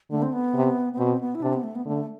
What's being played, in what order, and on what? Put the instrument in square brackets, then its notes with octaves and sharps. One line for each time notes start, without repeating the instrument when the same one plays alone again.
[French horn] D3 [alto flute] A3
[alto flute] C4
B3
[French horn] C3
[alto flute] B3
[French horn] B2 [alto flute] C4
[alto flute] B3
E4
[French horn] C3 [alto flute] D4
[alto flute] B3
A3
B3
[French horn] D3 [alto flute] A3